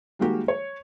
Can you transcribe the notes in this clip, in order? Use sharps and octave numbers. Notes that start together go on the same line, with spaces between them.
D#3 G3 G#3 A#3 F#4 G4
C#5